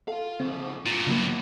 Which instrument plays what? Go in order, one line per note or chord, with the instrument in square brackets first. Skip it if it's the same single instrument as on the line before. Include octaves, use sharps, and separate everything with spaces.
[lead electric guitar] F4 F5 [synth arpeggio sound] A4
[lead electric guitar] C#3 F3 [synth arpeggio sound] C4
[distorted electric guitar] G2 A#2 [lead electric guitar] F4
[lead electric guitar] D#2 B3 [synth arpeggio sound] C#3 F#3 A#3